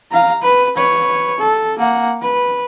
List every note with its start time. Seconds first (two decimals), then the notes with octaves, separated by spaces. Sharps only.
0.11 F5 A#5
0.43 B4
0.77 B4 C#5
1.39 A4
1.79 A#3 F#5
2.21 B4